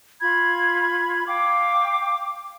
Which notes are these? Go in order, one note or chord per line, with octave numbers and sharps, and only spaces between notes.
F4 B5 G#6
F5 G5 D6